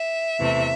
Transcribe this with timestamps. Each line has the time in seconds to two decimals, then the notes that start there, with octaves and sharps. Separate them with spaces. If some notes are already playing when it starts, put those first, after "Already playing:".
Already playing: E5
0.39 E2 C3 E3 A3